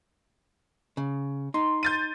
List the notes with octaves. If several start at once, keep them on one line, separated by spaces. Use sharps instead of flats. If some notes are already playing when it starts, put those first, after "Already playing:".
C#3
D#4 C6
G6 A6 D#7